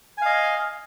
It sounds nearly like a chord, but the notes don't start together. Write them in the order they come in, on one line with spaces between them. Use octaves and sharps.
G#5 F5 D#5